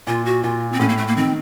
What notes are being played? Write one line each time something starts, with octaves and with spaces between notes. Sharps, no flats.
A#2 F4
F#4
A#2 F4
C4
A2 C#4
A#3
A3
A#3
D#3 C4